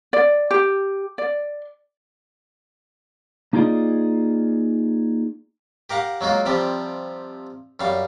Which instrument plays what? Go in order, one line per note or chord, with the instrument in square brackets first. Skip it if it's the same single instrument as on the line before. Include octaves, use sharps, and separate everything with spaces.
[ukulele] D5
G4
D5
[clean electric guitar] A#3 D#4 F4 G#4 D5 D#5
[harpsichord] G4 A#4 F5 F#5
F#3 G#3 A#3 F4
C3 F3 G3 G4
F#2 G3 F5